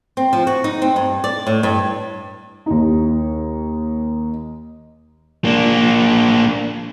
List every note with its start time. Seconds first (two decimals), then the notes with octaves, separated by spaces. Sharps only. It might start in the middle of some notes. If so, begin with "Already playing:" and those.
0.17 C4
0.33 F3
0.47 F#4
0.64 D#4
0.82 C4
0.96 G2
1.24 D5
1.47 A2
1.63 G2
2.66 D#2 D#4
5.45 A#3 D4